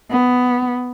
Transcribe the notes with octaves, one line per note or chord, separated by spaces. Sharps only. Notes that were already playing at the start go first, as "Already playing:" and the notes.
B3